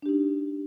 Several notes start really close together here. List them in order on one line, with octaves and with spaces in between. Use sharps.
D4 G4 D#4